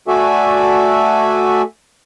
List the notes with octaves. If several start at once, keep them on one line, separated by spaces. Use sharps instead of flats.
A3 F#4 A4 D5 E5 G#5